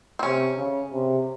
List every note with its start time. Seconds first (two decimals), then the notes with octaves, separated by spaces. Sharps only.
0.19 C4
0.23 C3 C#4
0.58 C#3
0.93 C3